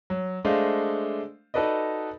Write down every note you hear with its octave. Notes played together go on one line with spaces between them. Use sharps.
F#3
G#3 A3 D4 C5 D#5 F5
D#4 F#4 A4 B4 D5 D#5